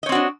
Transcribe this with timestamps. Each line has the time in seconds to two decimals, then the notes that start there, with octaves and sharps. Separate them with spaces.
0.03 D#5
0.06 C#5
0.09 C4
0.12 F#4
0.15 D4